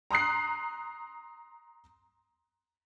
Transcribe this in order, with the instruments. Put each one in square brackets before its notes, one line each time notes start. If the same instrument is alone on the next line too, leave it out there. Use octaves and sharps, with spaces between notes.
[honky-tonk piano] A#5 C6 D#6 F#6 C7